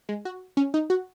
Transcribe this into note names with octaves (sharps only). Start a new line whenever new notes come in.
G#3
F#4
C#4
D#4
F#4